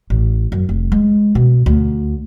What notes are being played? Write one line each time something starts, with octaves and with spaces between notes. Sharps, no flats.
A1
F#2
F1
G#3
B2
D2